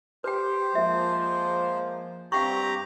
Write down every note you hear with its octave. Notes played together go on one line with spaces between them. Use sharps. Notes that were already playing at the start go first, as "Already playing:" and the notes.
G4 B4 C5 G5
F3 G#3 A#3 E5
G2 C4 G4 F5 F#5 A#5 C#6